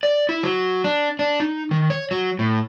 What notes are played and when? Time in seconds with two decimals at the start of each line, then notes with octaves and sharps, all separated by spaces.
0.03 D5
0.29 E4
0.43 F#3
0.84 D4
1.19 D4
1.40 D#4
1.71 D#3
1.90 C#5
2.11 F#3
2.39 A2